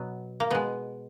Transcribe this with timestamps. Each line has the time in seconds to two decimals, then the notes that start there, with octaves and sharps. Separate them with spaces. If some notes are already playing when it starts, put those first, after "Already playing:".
Already playing: B2 F#3 B3
0.40 A#3
0.50 B2 G#3 B3